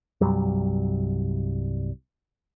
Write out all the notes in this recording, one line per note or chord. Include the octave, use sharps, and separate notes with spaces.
C2 G2 F#3 G3